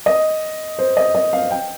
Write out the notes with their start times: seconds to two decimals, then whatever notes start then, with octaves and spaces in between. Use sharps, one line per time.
0.06 D#5
0.79 C5
0.97 D#5
1.15 D#5
1.33 F5
1.51 G5